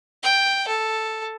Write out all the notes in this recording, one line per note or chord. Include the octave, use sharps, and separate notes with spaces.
G5
A4